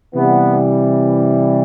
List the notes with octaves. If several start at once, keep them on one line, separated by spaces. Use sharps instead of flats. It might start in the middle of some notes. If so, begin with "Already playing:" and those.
C3 E3 G3 B3